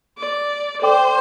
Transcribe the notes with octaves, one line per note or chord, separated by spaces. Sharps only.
D5
A4 C5 D5 G5 D6